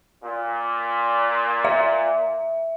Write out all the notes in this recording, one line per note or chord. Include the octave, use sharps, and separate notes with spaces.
A#2
E5